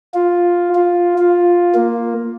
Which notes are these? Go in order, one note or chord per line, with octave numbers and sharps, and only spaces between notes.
F4
F4
F4
A#3